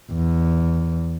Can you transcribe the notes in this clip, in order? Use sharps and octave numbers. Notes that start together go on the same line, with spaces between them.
E2